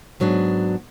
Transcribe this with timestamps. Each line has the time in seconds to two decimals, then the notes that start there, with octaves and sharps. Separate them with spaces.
0.20 G#2 F#3 B3 D4